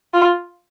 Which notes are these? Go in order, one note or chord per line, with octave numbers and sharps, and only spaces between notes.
F4